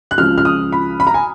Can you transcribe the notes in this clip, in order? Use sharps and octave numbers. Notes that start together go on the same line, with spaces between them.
F#6
C#2 C#3 F3 F6
F6
D#6
B5
B5
A#5
G#5